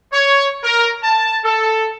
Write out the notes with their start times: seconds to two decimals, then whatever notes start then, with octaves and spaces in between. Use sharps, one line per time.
0.13 C#5
0.63 A#4
1.03 A5
1.44 A4